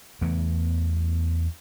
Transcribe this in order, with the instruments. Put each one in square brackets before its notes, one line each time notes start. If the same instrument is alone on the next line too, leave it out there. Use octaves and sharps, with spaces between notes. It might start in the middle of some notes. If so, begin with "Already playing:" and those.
[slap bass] E2 E3 A3 B3